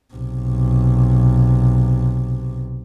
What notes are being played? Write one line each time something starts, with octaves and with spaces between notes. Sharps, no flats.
B1 C3